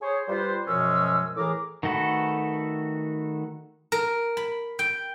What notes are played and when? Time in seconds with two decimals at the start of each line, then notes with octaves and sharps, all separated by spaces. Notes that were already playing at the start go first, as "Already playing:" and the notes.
0.02 G#4 C5 C#5
0.28 G3 F4 B4 C5
0.67 F#2 B2 F3 G#3 C#4 E6
1.36 A2 E3 G#4 A#4 D6
1.83 D#3 A3 F#4 A4 B4
3.92 A#4
4.37 B5
4.79 G5